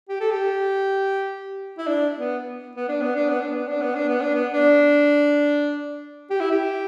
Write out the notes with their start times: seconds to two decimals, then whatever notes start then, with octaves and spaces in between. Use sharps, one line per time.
0.09 G4
0.20 A4
0.30 G4
1.78 E4
1.87 D4
2.17 B3
2.76 B3
2.88 D4
3.02 B3
3.15 D4
3.29 B3
3.41 D4
3.55 B3
3.68 D4
3.82 B3
3.95 D4
4.09 B3
4.21 D4
4.35 B3
4.52 D4
6.30 G4
6.40 E4
6.51 G4